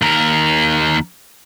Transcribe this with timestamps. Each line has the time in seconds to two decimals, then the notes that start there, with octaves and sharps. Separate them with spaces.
0.02 D#2 A#4